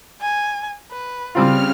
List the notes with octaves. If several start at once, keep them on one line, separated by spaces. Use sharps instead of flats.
G#5
B4
C#3 G3 C4 F4 F6